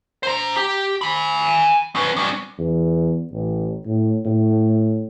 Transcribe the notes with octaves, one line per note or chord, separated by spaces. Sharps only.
C5 A#5
G4
G#5 B5
C#4 B4
G3 C#4
E2
A1
A2
A2